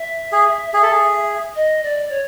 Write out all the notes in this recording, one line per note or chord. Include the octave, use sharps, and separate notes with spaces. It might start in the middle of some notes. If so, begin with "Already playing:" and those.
Already playing: E5
G#4
G#4
A4
G#4
D#5
D5
C#5